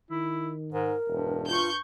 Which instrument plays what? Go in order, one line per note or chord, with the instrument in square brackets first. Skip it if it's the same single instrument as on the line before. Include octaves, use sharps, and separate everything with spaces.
[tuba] D#3 [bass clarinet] E4
[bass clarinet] G#2 [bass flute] A#4
[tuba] E1 [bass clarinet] G2
[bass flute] F4 [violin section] C#6 G6